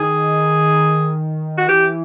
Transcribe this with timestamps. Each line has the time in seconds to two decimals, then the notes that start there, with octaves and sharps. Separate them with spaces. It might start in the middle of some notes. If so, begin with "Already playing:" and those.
Already playing: D#3 G#4
1.58 F#4
1.68 E3 G4